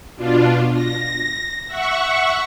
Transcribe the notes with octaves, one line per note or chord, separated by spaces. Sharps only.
B2 D4 F4
A#6
E5 F#5 C#6